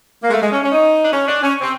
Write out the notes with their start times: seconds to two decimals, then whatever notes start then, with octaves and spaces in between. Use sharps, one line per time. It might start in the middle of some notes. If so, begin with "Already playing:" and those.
0.23 G#3 A#3
0.32 A3
0.42 G#3
0.52 C#4
0.63 C#4
0.72 D#4
1.04 D4
1.12 C#4
1.28 D4
1.42 C#4
1.61 C4